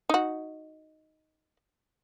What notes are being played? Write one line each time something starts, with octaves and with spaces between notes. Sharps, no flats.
D#4 F#4